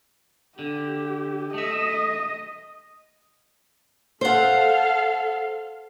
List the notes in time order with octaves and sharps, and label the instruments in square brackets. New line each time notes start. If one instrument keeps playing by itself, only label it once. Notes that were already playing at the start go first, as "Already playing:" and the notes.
[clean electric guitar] D3 [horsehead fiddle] G4
[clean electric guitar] A3 E5 [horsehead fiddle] D#5
[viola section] A4 F5 [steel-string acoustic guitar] C5 F#5